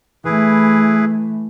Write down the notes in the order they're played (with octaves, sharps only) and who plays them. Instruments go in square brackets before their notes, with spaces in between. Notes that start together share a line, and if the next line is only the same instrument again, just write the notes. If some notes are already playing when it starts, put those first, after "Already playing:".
[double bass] E3 A3 [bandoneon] E4 G#4 B4